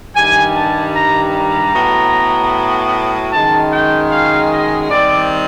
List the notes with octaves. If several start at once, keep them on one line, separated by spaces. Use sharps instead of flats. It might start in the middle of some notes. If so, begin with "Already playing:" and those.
G2 D#3 G3 G#5
A5
A#5
A#5
A2 F#3 B3
F#2 D#3 G#3 A5
G5
F5
D#5
D#3 G3 C4 D5